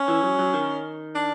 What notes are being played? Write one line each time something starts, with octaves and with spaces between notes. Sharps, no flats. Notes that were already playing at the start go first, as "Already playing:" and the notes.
Already playing: C#4
E3
F#3
F#3
D#3
D4